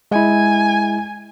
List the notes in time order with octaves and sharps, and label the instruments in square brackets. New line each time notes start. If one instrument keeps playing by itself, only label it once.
[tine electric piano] G#3 E4 [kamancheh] G#5